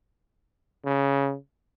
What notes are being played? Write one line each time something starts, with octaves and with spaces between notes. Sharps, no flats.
C#3